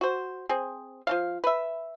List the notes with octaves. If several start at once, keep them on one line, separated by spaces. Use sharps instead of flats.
F#4 C5
C4 G#4
F3 D4 F5
B4 E5